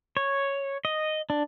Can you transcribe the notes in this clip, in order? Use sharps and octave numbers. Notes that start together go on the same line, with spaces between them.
C#5
D#5
D4